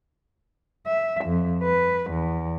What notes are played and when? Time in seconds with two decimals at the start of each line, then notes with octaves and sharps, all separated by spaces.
0.87 E5
1.25 F2
1.63 B4
2.11 E2